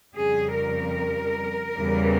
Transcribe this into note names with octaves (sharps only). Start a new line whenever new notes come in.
F2 C#3 G3 G#4
A#4
E2 C#3 E3 G3